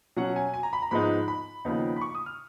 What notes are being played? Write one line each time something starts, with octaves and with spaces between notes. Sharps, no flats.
B2 F#3 C#4 F#5
G#5
G#5
A#5
B5
A#5
G#2 F3 G#3 B3 D#4 B5
B5
D#2 C#3 F3 B3 D#4
B5
C#6
D#6
F6